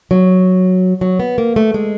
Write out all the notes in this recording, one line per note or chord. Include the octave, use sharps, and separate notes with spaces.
F#3
F#3
B3
A#3
A3
G#3